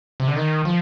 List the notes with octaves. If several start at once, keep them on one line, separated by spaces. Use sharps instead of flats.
C3
D3
D#3
F3